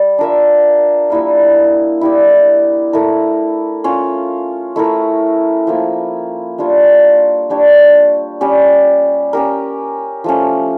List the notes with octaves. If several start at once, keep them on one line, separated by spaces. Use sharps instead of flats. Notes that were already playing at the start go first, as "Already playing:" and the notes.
Already playing: G3
D4 F4 A#4 E5
G3 A#3 E4 A#4
E4 G4 D5
A3 E4 A#4
C#4 F4 C#5
A3 E4 A#4
F3 A#3 E4
G3 D4 F4 C#5
G3 D4 G4 C#5
G3 C#4 G4
C#4 G4 A#4
F3 A3 C#4